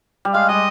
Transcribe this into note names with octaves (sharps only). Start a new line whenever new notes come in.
G3
G#3 F5
G3 D#5